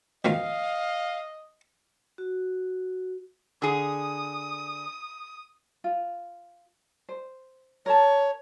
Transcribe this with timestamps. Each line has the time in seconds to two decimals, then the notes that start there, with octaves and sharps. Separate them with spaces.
0.25 B2 D#3 F3 D#5 F5
2.18 F#4
3.62 D3 G#4 D#6
5.84 F4
7.09 C5
7.86 A#4 C#5 A5